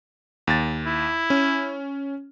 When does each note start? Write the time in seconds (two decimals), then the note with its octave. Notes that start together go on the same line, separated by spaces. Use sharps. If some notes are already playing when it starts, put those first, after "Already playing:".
0.47 D#2 A6
0.86 E4
1.30 C#4